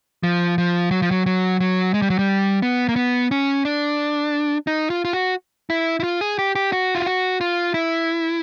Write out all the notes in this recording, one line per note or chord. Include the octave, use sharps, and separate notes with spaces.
F3
F3
F#3
F3
F#3
F#3
F#3
G#3
G3
F#3
G3
B3
A#3
B3
C#4
D4
D#4
F4
F4
F#4
E4
E4
F4
G#4
G4
G4
F#4
F4
F#4
F4
E4